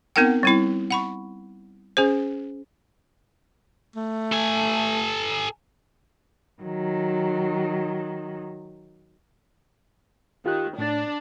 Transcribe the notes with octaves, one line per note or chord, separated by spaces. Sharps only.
B3 C4 D#4 A#4 F#5 G5
G3 C4 E4
F#5 B5 C#6
C#4 G#4 C5
A3
A4 G#5
D#3 F#3
D#3 F4 G4 F#6
A2 D4 A6